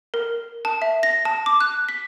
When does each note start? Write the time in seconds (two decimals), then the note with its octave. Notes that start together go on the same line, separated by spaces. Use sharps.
0.14 A#4
0.65 A5
0.82 E5
1.03 A#6
1.25 A5
1.46 D6
1.60 F#6
1.89 B6